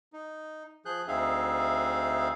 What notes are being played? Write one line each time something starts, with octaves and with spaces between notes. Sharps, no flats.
D#4
F3 G#4 F#6 G6
D2 C4 D#4 G#4 E5 F5